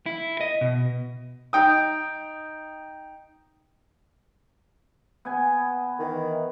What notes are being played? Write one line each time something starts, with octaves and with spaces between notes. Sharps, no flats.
E4
D#5
B2
D#4 G5 D#6
B3 G#5
D#3 E3